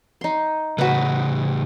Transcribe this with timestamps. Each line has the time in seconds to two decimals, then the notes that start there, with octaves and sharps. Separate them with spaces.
0.21 D#4 C6
0.78 A2 C#3 F#4 B4